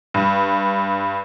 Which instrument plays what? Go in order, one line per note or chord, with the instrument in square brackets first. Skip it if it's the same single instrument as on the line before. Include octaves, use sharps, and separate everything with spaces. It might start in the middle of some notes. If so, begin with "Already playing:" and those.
[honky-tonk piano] G2